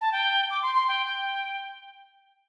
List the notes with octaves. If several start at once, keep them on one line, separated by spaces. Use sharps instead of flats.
A5
G5
D6
C6
C6
G5
G5